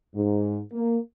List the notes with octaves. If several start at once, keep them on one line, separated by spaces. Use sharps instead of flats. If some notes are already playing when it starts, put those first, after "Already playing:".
G#2
A#3